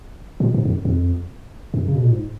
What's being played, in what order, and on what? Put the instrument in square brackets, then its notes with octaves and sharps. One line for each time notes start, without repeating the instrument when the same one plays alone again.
[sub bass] A#2
G#2
F2
F#2
F2
F#2
C#3
B2
A#2
G#2